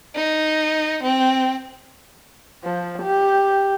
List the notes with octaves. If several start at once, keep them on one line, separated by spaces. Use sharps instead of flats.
D#4
C4
F3
G4